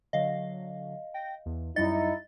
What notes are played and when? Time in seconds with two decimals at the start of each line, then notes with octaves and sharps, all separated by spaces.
0.13 D3 F#3 D#5 F5
1.14 G5 A#6
1.46 E2
1.76 F#2 G3 D#4 E4 D#5 A6 C#7